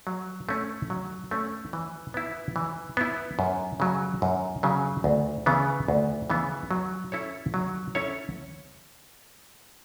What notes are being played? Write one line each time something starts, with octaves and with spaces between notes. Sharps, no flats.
F#3
A3 C#4
F#3
A3 C#4
E3
B3 E4
E3
B3 E4
F#2
C#3 F#3
F#2
C#3 F#3
D2
C#3 E3 B3
D2
C#3 E3 B3
F#3
C#4 E4 A4 C#5
F#3
C#4 E4 A4 C#5